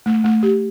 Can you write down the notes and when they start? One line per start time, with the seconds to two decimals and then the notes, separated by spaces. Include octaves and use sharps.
0.06 A3
0.24 A3
0.43 G4